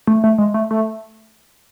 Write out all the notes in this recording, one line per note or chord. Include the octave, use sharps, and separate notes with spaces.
A3
A3
G#3
A3
A3